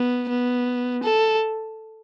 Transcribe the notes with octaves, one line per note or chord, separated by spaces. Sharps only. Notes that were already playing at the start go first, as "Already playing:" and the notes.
Already playing: B3
B3
A4